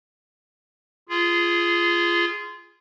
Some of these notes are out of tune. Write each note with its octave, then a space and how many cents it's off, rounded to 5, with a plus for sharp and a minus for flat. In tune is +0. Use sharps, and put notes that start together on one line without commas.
F4 -20 G#4 +0